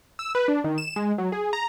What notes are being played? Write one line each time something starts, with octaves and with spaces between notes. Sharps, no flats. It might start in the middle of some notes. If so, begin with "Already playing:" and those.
E6
B4
D4
D#3
E7
G#3
F#3
G#4
A#5